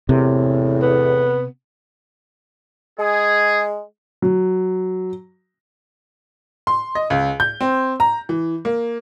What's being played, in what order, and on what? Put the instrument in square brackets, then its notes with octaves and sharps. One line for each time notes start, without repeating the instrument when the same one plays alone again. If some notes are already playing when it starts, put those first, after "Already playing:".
[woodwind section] E2 A2 [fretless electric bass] C3
[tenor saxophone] B3
[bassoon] G#3 [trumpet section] G#4
[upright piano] F#3
C6
D#5
C#2
G6
C4
A#5
E3
A#3